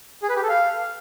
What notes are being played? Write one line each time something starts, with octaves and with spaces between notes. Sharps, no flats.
G#4
B4
G4
A4
F5